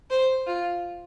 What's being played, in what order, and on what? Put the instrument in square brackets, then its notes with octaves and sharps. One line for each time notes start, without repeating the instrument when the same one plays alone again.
[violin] C5
F4